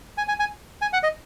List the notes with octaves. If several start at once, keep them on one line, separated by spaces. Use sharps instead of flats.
G#5
G#5
G#5
G#5
F#5
D#5